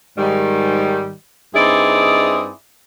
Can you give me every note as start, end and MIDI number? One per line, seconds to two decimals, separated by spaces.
0.18 1.12 44
0.18 1.12 51
0.18 1.12 55
1.54 2.50 43
1.54 2.50 60
1.54 2.50 63
1.54 2.50 64
1.54 2.50 68
1.54 2.50 74